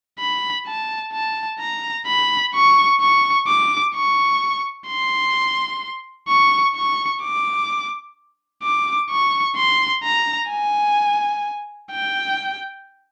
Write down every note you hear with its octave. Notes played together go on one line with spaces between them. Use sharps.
B5
A5
A5
A#5
B5
C#6
C#6
D6
C#6
C6
C#6
C#6
D6
D6
C#6
C6
A#5
G#5
G5